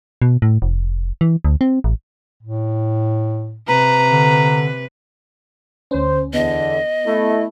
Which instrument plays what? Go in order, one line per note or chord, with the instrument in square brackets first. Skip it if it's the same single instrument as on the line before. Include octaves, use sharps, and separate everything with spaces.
[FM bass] B2
A2
F1
E3
D2
C4
A1
[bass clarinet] A2
[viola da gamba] C3 B4 [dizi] A#5
[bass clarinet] D3
[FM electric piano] D2 C#4 [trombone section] C5
[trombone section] E2 D3 [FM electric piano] B3 [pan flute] D#5
[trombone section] A3 E4